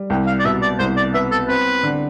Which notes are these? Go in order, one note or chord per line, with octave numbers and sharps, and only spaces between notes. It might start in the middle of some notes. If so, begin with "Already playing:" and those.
Already playing: G3
C2 G5
F5
D5
B2 E5
D5
C2 C5
D5
B3 E5
A4
C4 B4
D3